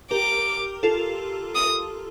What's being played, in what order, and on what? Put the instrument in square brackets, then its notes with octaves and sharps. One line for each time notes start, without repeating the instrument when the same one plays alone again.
[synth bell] G4 A#4 [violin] D6
[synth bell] F4 A4
[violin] D#6